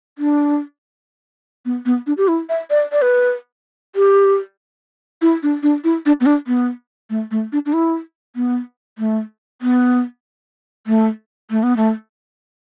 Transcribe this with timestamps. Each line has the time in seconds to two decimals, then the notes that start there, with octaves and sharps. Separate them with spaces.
0.18 D4
1.65 B3
1.86 B3
2.07 D4
2.18 G4
2.28 E4
2.49 E5
2.70 D5
2.92 D5
3.02 B4
3.96 G4
5.22 E4
5.43 D4
5.63 D4
5.84 E4
6.06 D4
6.21 B3
6.26 D4
6.47 B3
7.10 A3
7.31 A3
7.52 D4
7.66 D4
7.73 E4
8.36 B3
8.98 A3
9.62 B3
10.87 A3
11.51 A3
11.63 B3
11.77 A3